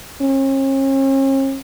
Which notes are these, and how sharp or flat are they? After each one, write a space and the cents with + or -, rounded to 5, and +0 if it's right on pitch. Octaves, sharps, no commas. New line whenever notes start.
C#4 -45